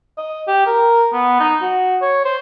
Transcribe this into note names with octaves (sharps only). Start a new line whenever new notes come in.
D#5
G4
A#4
B3
D#4
F#4
C#5
C5